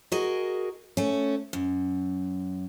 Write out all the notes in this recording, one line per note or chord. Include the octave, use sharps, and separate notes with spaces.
F#4 G#4 A#4 D#5
A3 C#4
F#2